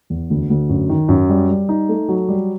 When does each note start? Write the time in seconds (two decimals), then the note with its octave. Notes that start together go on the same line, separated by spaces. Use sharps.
0.10 E2
0.30 D2
0.50 D2
0.69 F#2
0.89 D#3
1.09 F#2
1.29 G3
1.49 G3
1.69 D#4
1.89 A3
2.09 F#3
2.29 G3